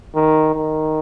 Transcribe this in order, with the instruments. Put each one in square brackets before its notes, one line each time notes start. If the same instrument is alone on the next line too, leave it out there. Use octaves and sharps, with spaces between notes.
[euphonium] D#3
D#3